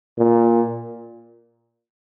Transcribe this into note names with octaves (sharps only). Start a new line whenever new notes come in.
A#2